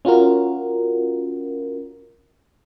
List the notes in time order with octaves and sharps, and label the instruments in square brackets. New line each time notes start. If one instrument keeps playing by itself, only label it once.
[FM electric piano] C#4 F4 F#4 A#4